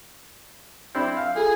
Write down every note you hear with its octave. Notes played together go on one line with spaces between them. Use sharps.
C4 D4 E4 E5 E6 G6
F5
F4 G#4 A4